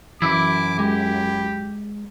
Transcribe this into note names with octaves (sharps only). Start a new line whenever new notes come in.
F#2 E3 E4 E5 D6
G#3 G4